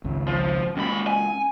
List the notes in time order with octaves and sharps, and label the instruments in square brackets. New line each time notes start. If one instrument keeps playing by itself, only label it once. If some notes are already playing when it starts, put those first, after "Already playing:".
[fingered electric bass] G#1 C#2 C#3
[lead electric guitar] F3
[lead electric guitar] D#2 B5 [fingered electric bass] G#3 A#3 C#4
[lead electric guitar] G#5